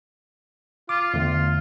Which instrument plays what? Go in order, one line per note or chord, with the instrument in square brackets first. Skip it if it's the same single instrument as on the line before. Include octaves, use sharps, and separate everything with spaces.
[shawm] F4 [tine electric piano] D6
[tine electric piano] E2 D3 A3 [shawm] F4